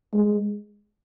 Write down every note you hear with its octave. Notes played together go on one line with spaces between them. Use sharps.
G#3